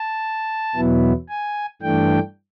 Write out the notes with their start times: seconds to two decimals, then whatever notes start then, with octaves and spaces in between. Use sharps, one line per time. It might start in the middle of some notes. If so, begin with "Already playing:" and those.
Already playing: A5
0.75 E2 B2 F#3 B3 E4
1.29 G#5
1.82 G2 E3 A3 D4 G5